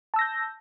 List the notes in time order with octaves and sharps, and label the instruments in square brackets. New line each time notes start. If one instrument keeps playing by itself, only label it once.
[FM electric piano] A5
E6
A#6
G6